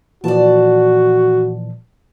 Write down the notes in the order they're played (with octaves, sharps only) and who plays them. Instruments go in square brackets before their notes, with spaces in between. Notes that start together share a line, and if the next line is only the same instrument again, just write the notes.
[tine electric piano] A#2 E3 F3 [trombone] F#4 [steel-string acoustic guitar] D5 A5